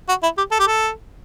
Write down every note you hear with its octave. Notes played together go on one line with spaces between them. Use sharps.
F#4
E4
G4
A4
G4
A4